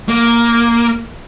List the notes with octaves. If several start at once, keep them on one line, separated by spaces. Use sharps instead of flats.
A#3